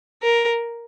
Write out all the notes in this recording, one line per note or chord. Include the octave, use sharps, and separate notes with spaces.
A#4